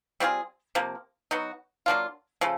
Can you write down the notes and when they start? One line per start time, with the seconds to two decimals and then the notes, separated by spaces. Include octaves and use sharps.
0.20 G3 C4 F4 G#4
0.75 C3 F3 A#3
1.31 F#3 B3 D#4 F#4
1.86 F#3 A#3 D4 F4
2.41 C#3 F3 A3